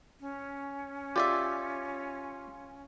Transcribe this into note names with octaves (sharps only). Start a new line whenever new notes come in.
C#4
F4 G4 D5 E5